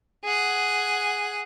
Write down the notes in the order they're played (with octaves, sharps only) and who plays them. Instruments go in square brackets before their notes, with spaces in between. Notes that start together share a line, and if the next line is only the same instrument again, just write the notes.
[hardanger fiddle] G#4 F#5